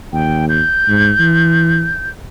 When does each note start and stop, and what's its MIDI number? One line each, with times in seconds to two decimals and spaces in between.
0.13 0.61 39
0.13 0.45 79
0.49 2.10 91
0.88 1.11 44
1.19 1.90 52